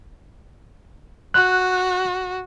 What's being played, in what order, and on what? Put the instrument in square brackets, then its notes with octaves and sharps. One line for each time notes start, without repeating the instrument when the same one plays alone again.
[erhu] F#4 [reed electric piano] F#6